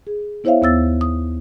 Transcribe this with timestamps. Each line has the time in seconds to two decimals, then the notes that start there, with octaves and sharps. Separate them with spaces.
0.07 G#4
0.44 B3 E4 C5 C#5 E5 F5
0.62 D#2 B3 E6 A6
1.01 D#6